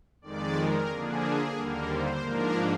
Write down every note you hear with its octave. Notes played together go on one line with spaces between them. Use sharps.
F2 D#3 G#3 D5
A#4
D3 F3 A#3 D4 G#4
D#2 D3 G3 A#3 A#4
C5
G#2 F3 A#3 D4 A#4